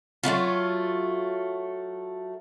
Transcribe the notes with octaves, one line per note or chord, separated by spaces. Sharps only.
F#3 A3 B3 F4